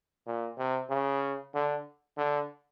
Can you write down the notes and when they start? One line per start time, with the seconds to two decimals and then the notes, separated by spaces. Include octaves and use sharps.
0.26 A#2
0.58 C3
0.90 C#3
1.55 D3
2.18 D3